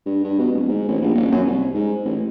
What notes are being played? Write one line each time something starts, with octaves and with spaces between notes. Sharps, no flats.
G2
G2
B2
D1
G#2
A1
A#1
D#1
F#2
C2
G#2
A1